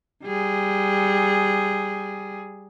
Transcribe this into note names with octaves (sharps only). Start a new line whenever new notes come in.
G3 G#4